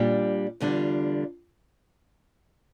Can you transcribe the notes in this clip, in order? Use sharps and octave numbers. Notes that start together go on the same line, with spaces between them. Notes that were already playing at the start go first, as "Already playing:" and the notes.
Already playing: A#2 G3 D4
E2 D3 G3 D4 F4